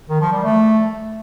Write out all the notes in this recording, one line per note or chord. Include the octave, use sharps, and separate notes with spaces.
D#3
F3
G3
A3